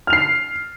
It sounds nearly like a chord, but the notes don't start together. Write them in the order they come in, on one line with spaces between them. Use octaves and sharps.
F6 F7 C7